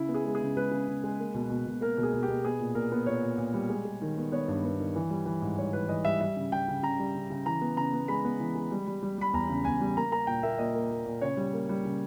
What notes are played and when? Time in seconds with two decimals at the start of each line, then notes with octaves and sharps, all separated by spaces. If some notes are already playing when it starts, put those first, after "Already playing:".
Already playing: C#3 E4
0.09 B3
0.14 G#4
0.25 G#3
0.35 G#4
0.41 C#3
0.57 G#3 B4
0.71 C#3
0.88 C#3
1.04 G#3
1.19 A#3
1.35 B2
1.50 B2
1.67 B2
1.81 A#3 A#4
1.97 B2
2.03 G#4
2.14 B2
2.23 G4
2.28 B2
2.45 B3 G#4
2.60 A#2
2.75 A#2 A#4
2.92 B3
3.06 A#2 C#5
3.23 A#2
3.38 A#2
3.54 G3
3.70 G#3
3.85 G#3
4.02 D#3
4.17 B3
4.32 B3 C#5
4.48 G2
4.64 B3
4.79 D#3
4.96 E3
5.10 G3
5.26 E3
5.42 G#2
5.58 G3 C#5
5.73 E3 B4
5.88 E3 D#5
6.04 G3 E5
6.20 G3 E5
6.37 C#3
6.52 G3 G5
6.68 C#3
6.83 C#3 A#5
6.99 G3
7.14 C#3
7.30 C#3
7.46 E3 A#5
7.61 B3
7.76 C#3 A#5
7.93 B3
8.08 G#3 B5
8.25 B3
8.40 E3
8.55 G#3
8.71 G3
8.87 G3
9.03 G3
9.18 G3 B5
9.33 E2 A#5
9.49 C#3
9.65 E2 G#5
9.81 G3
9.97 A#3 A#5
10.12 A#3 A#5
10.27 A#2 G5
10.43 A#3 E5
10.58 A#2 D#5
10.75 A#3
10.91 A#3
11.06 A#2
11.22 C#3 C#5
11.37 G3
11.54 A#3
11.69 G3
11.85 C#3